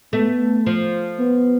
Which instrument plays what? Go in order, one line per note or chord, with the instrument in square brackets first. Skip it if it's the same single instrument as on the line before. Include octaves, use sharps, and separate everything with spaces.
[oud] A3 [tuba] B3
[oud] F3
[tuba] B3